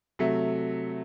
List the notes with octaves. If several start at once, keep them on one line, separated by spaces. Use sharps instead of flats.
C3 F#3 A3